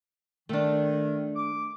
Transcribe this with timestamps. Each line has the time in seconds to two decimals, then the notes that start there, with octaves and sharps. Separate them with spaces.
0.49 D#3 A3 D4
1.36 D6